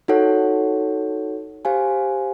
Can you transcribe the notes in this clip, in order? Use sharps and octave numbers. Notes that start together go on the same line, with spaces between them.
D#4 F#4 A4 C#5 F#5
G4 C5 F5 G#5